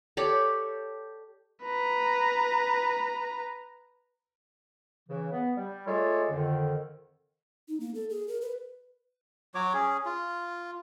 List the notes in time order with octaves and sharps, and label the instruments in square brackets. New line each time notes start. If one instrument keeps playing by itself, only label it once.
[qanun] G4 A4 C#5 D5
[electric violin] B4 A#5
[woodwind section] C#3 E3
B3
G3
G#3 A3 F4 A4 C#5 D5
F2 D3 D#3
[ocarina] D#4
A#3
A4
G#4
A#4
B4
[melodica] F#3 F#4 C#5 D6
C#4 G#4
F4